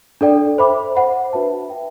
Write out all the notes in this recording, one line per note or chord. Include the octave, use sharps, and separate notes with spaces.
D4 A4 D5 G5
A4 C5 E5 B5 D6
C5 F#5 B5
D4 F#4 B4 E5 A5
B4 E5 G5